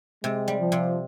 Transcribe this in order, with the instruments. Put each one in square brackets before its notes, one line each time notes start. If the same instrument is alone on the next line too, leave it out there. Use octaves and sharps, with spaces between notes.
[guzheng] C3 [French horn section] G#3
[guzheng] G3
[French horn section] F3
[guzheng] C3